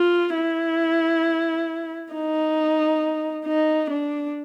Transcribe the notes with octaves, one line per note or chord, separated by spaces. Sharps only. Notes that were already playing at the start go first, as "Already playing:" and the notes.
Already playing: F4
E4
D#4
D#4
D4